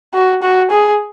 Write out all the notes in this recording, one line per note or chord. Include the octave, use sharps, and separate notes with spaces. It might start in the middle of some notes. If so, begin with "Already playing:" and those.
F#4
F#4
G#4